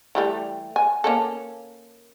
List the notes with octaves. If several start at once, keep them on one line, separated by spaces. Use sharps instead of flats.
E3 G3 A3
G#5
A#3 C#4 A4